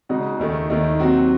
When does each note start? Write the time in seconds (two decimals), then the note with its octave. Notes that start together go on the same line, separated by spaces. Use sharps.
0.09 C#3 G#3 D#4 F#4
0.39 D#2 D#3 A3
0.70 D#2 D#3 A3 D#4
1.00 C3 F#3 C4 F#4